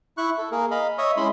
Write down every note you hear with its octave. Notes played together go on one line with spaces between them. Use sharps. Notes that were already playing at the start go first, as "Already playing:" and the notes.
E4 C#6 F#6
A4
A#3 G#4 A#4
D#5 F5 B5
C#5 D#5 E5 C#6 D#6
G#3 C#4 E4 B5 C6